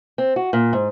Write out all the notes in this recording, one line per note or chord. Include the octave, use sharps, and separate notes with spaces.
C4
F#4
A#2
G#2